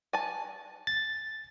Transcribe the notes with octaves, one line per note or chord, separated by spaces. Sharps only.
G#5 A5
A6